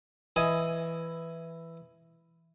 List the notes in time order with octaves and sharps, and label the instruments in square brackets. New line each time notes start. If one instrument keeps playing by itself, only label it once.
[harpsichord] E3 E4 D#5 G#5